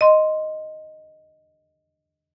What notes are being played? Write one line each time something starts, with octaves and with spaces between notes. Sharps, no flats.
D#5 C6